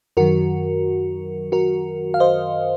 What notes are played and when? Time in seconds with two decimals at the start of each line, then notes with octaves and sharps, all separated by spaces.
0.17 F#2 D#3 F#3 F#4 A#4
1.52 F#4 A#4
2.14 F5
2.20 C5 D#5